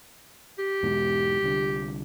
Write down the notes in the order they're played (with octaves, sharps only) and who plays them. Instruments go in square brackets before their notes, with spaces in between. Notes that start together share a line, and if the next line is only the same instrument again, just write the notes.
[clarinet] G4
[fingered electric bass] E2 G#2 B2
C2 D3